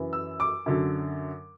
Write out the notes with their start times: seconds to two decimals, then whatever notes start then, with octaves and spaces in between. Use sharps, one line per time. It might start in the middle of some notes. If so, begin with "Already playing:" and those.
Already playing: F#2 E3
0.13 E6
0.40 D6
0.66 F#2 D3 F#3